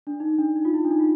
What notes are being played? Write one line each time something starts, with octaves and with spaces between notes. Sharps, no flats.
D4
D#4
D4
D#4
F4
E4
D4
D#4
F4